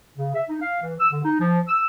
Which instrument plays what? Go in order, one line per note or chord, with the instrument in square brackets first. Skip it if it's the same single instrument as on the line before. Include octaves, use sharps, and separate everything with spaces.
[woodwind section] C#3
E5
D#4
F5
E3
E6
D3
D#4
F3
E6